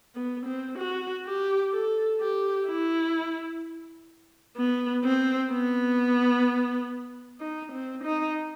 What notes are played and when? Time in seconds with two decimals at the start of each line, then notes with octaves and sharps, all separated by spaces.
0.15 B3
0.47 C4
0.79 F#4
1.26 G4
1.73 A4
2.21 G4
2.68 E4
4.57 B3
5.04 C4
5.51 B3
7.41 D#4
7.73 C4
8.04 D#4